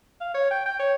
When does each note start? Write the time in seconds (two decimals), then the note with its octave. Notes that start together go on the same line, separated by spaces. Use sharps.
0.21 F5
0.34 C#5
0.51 G5
0.66 G5
0.79 C#5